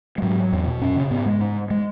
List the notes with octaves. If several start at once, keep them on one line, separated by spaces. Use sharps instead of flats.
G#3
G#2 F#3
E2
B2
F#2 C#4
C#3
G#2 B3
G#3
G#2
G#3